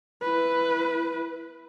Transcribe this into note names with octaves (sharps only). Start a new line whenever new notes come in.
E4 B4